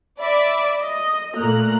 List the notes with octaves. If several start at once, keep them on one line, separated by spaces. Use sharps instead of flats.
D5 E5 B5 D6
D#5
A#2 A3 A#3 A#5 F#6